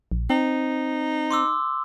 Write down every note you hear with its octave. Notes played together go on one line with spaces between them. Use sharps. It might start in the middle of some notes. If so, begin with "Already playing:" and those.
A#1
C4 D#4
C6 D6 E6